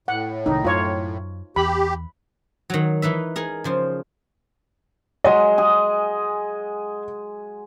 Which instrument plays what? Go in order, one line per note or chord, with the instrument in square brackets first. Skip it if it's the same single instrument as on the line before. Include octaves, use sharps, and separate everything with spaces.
[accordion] A2 [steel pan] F#5
[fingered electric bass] C2 C3 D#3 [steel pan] D#4
[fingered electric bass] F#2 [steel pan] F4 C#5
[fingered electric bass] E2 [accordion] G4 [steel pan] B5
[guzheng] D#3 F#3
E3 D#4 B4 E5
D#4 G#4 A#4
C#3 F3 C5
[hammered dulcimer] F#3 G#3 [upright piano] D#5
[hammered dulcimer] G#4